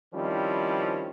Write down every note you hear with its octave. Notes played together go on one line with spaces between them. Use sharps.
D#3 F3 G3 C4 C#4 E4